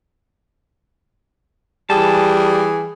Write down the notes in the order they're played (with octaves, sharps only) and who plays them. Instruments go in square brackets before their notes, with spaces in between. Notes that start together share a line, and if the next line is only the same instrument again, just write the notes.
[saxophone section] E3 G#4 [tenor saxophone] G3 [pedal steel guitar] A5